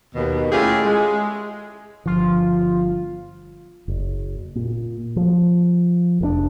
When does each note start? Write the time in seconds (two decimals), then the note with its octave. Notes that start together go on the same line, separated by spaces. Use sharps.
0.15 D#2 B2
0.52 A3 C#4 E4 F4 G4 G#4
0.85 G#3
2.06 G1 F3 F4
3.88 F#1
4.55 A#2
5.16 F3
6.21 F1 G#2 D4